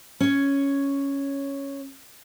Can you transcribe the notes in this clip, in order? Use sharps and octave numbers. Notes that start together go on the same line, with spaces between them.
C#4 C#5